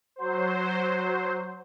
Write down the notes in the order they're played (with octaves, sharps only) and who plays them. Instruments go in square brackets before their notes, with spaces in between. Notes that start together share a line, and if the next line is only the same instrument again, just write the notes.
[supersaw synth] F#3 C5